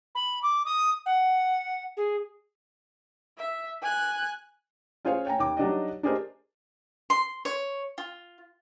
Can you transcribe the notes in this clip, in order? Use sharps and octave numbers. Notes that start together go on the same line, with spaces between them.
B5
D6
D#6
F#5
G#4
E5
G#5 F#6
C#4 F4 G#4 C5 C#5 F5
C#5 G5 G#5 A#5
D#2 D6
F#3 G3 D4 D#4 D5 D#5
D4 G4 G#4 A#4 C5 D#5
C6
C#5
F4